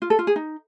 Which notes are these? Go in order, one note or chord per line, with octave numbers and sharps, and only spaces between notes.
F4
A4
F4
G#4
D#4